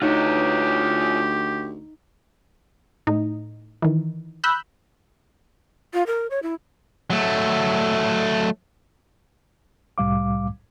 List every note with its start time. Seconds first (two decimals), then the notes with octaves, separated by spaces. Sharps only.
0.02 D2 D#4 F4 G4 C#5
3.07 A2 D#4
3.82 D#3 E3
4.44 B5 E6 F#6 G6
5.94 F4
6.07 A#4
6.30 C#5
6.43 E4
7.10 F#3 A3
9.98 C2 A2 G3 F5 D6